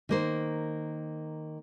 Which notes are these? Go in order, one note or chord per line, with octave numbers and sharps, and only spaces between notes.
D#3 A#3 C5